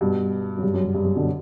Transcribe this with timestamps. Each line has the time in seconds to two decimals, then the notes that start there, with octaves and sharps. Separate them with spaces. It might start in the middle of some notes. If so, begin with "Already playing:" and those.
0.01 G2 B2
0.57 F#2
0.63 G2
0.73 F#2
0.84 G2
0.95 G2
1.05 G2
1.15 B2 D3